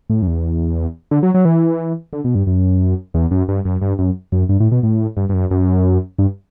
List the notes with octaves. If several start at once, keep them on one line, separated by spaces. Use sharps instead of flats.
A2
F#2
E2
D3
F#3
F#3
E3
D3
B2
G2
F#2
E2
F#2
G2
F#2
G2
F#2
F#2
G2
A2
B2
A2
G2
G2
F#2
F#2
G2